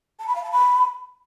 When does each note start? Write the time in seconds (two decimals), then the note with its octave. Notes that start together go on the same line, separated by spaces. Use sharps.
0.20 A5
0.28 B5
0.36 F5
0.44 A5
0.52 B5